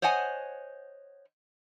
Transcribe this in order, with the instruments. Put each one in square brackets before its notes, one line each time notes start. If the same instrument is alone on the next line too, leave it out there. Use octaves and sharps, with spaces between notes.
[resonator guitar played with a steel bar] C5 C#5 D#5 F#5 G#5